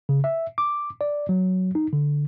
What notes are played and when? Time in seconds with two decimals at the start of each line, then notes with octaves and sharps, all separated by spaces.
0.09 C#3
0.24 E5
0.58 D6
1.01 D5
1.29 F#3
1.75 D#4
1.93 D3